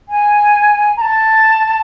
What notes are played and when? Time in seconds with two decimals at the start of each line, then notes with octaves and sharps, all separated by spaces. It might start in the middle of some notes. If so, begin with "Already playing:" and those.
0.09 G#5
0.97 A#5
1.01 A5